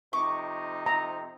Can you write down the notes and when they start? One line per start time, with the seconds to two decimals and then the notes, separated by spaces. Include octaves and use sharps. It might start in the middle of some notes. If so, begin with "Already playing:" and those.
0.13 F2 C3 D#4 C#6 D6
0.86 A#5